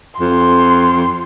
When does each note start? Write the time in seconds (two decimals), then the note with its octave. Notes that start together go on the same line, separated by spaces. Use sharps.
0.21 F2 C6